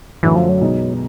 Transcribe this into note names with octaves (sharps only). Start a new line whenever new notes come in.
F#2 D3 E3 F#3 A3 D4
F3
F#3
B1 B2 G#3 B3 D#4